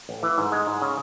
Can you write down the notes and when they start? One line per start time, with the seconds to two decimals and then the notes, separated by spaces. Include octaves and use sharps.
0.09 A1
0.23 E3
0.38 G#2
0.52 G#3
0.67 G#2
0.82 C#3